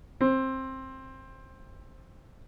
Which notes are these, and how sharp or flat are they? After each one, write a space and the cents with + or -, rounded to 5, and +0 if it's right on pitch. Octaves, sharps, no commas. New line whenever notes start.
C4 +15